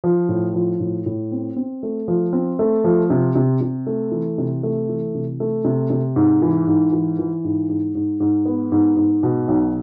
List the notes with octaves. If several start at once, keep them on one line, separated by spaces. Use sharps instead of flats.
F3
A2
F3
A2
A2
C4
C4
A3
F3
C4
A3
F3
C3
C3
C3
A3
E3
C3
A3
E3
C3
A3
C3
C3
G#2
E3
G#2
E3
E3
G#2
G#2
G#2
G#2
B3
G#2
G#2
B2
B1